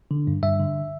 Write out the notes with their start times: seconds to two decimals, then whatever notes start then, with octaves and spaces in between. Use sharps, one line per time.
0.11 D3
0.27 G2
0.43 G2 E5
0.60 D3